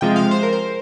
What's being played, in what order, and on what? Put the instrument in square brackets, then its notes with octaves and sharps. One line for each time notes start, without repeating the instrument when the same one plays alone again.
[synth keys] C3 F3 G#3 G5
F5
C5
A#4
C5